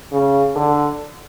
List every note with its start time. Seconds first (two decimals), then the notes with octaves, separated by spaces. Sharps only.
0.12 C#3
0.55 D3